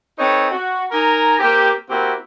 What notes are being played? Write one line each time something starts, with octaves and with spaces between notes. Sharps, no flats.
C4 D#4 A4 B4 C#5
F#4
D#4 A#4 G#5 A#5
A#3 C4 G4
A#3 C4 E4 F#4 G4